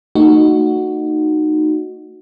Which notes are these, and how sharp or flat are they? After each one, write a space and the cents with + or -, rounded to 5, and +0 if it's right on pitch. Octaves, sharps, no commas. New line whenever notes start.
A3 +35 D#4 -15 F#4 +0